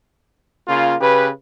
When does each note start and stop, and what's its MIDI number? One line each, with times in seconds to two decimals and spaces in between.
0.68 0.96 49
0.68 0.96 58
0.68 0.96 65
1.01 1.29 49
1.01 1.29 67
1.01 1.29 71